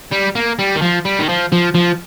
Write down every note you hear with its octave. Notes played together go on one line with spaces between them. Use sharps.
G3
A#3
G3
D#3
F3
G3
D#3
F3
F3
F3